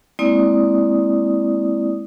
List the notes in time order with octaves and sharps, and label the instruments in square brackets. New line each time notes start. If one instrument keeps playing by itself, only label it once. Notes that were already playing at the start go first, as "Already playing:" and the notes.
[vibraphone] G#3 A#3 C4 E4 D5 D#6